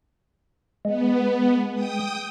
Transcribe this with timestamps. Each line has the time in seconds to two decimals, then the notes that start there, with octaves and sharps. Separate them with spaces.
0.85 G#3 B3
1.74 G5 D#6